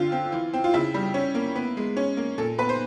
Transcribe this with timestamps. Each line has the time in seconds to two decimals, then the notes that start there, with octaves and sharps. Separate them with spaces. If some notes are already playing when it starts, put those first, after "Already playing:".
Already playing: D3 C4 F4
0.12 C4
0.32 E3
0.53 C4
0.64 F4
0.74 C#3 E4
0.94 G3
1.14 C#4
1.35 A#3
1.55 B3
1.77 G#3
1.97 C#4
2.17 A#3
2.38 A#2 A4
2.58 B3 B4
2.69 C5